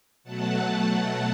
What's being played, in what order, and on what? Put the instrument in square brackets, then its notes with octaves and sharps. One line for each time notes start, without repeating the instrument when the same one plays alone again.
[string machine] B2 F#3 A3 F#5 A5